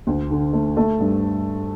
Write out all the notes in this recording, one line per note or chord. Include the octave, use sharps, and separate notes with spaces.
D2
D3
A3
A3
G2